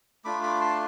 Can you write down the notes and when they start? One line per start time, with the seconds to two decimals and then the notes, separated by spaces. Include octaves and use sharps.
0.25 A3 D4 F4 B5 D6
0.43 B5 D6
0.61 A5 C6